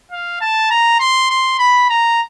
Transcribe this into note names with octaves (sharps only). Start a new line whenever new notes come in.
F5
A5
A#5
C6
C6
B5
A#5